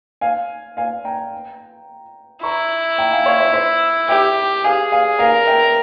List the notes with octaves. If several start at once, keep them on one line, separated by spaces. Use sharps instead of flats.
F5 G#5
F5 G#5
G5 A#5
E4 A#5 C#6
G5 A#5
F5 G#5
C#5 F5
C5 E5
C5 E5
G4 E5 G5
G#4 F5 G#5
F5 G#5
A#4 F5 G#5
E5 G5